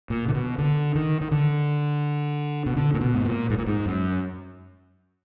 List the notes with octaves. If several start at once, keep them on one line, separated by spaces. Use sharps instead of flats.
A#2
D3
B2
D3
D#3
D#3
D3
B2
D3
A#2
B2
G#2
A#2
G#2
A#2
G#2
F#2